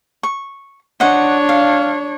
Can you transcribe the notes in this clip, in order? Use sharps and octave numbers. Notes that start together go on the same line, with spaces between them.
C#6
D4 C5 C#5 D#5 F#5
F5